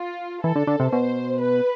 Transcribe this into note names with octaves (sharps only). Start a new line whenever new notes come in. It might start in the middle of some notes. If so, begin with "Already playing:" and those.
Already playing: F4
E3 A4
D3
D3
C3
B2 C5
B4